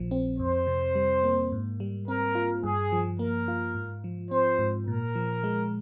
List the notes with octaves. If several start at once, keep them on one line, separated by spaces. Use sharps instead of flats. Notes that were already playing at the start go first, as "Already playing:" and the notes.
Already playing: A#1 A#2 F3
C4
F2 C5
C3
G3
A#3
G#2
G3
C4 A#4
F4
G2 G#4
F3
A#3 A#4
F4
G#2
F3
C4 C5
G#2
A#2 A#4
F3
G#3